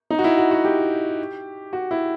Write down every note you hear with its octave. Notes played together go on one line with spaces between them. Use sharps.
D#4
F#4
E4
F#4
F#4
G4
F#4
E4